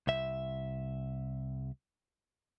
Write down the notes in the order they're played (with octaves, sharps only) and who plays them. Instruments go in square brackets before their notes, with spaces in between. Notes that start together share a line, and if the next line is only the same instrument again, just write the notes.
[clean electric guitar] C2 E5